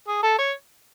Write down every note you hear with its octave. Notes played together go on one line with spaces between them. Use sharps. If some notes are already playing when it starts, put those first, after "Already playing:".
G#4
A4
C#5